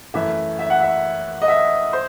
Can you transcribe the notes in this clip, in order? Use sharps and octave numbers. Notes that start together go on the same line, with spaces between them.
F#2 E3 A3 E5
E5
F#5
E5
D#5
E5
C5